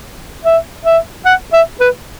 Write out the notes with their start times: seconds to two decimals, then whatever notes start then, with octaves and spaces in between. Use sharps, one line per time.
0.45 E5
0.85 E5
1.26 F#5
1.53 E5
1.81 B4